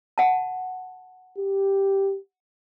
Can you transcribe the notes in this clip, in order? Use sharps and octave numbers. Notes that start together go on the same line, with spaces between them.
F#5 A5
G4